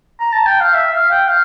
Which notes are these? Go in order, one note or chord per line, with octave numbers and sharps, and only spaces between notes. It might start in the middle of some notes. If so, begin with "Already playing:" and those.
A#5
A5
G5
F5
E5
F5
G5
F5